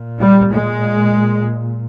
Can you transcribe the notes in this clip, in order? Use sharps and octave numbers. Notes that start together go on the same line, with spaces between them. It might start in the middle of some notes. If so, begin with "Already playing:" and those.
Already playing: A#2
G3
G#3